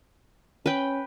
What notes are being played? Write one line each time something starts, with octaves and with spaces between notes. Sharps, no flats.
C#4 B4 G5